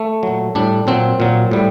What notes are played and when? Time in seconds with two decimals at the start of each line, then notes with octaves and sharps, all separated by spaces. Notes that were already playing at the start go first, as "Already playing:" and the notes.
Already playing: A3
0.23 A#2 F#3
0.55 A2 G3 D4
0.87 A#2 F#3 C4
1.20 A#2 F#3
1.51 A2 G3